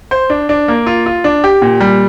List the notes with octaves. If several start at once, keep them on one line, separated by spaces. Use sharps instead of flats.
C5
D4
D4
A#3
F4
F4
D4
G4
A#2
G3